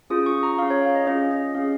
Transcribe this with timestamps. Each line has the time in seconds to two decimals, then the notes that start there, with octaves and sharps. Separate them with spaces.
0.10 C#4 F4 G#4 D#6
0.26 C#6
0.43 A#5
0.58 G#4 F5
0.62 C#4
0.70 C#5
0.86 F5
0.95 D#5
1.07 C#4 F4 G#4 D#5
1.31 D#5
1.55 C#4 F5
1.59 G#4